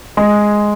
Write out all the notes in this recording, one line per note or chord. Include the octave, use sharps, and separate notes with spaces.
G#3